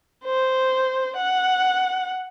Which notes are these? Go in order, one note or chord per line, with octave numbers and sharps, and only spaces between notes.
C5
F#5